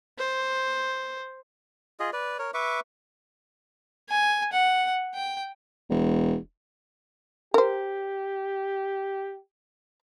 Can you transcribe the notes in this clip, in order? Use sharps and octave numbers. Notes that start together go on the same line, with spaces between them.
C5
F4 G#4 D#5
B4 D5
A#4 C#5
B4 E5 C#6 D6
G#5
F#5
G5
E1
G4 A#4 C5